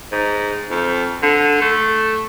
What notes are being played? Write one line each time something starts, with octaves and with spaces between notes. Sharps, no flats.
G#2
F2
D3
A3